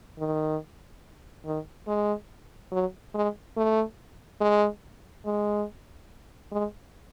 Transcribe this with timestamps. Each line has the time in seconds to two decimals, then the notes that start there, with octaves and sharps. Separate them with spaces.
0.18 D#3
1.45 D#3
1.87 G#3
2.71 F#3
3.14 G#3
3.57 A3
4.41 G#3
5.26 G#3
6.52 G#3